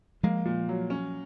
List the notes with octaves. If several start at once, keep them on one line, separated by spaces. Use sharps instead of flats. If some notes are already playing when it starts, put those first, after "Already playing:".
F3 G#3 A#3
A#2
F#3
C#4